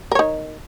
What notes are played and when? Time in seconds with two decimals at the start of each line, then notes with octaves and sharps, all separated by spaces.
0.12 A#4
0.15 C#5
0.19 D#4